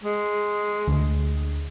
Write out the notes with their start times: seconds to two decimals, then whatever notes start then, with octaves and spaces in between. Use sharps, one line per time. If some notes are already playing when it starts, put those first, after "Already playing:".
0.03 G#3
0.87 D2